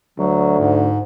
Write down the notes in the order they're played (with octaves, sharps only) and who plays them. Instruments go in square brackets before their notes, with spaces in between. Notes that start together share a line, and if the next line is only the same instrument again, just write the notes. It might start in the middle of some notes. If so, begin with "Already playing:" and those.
[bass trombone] D2 [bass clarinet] F#3
[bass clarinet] G#2